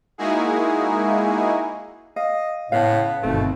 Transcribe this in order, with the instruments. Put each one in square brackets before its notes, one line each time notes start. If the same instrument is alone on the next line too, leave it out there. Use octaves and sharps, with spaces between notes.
[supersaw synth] G#3 A#3 D#4 E4 F#4 G#4
[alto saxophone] D#5 [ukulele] F5
[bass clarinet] A2 [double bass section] C#3 [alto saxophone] B3 [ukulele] F5 A5
[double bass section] G1 D#3 C4 [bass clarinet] B2 [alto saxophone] A3